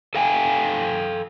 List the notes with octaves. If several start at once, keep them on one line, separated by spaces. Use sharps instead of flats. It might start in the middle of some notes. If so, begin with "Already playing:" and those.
A4 F5 G5 G#5